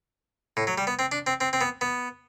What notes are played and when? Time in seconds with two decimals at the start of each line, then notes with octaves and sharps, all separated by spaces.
0.57 A2
0.67 F#3
0.78 G3
0.87 B3
0.99 C4
1.12 D4
1.27 C4
1.41 C4
1.53 C4
1.61 B3
1.81 B3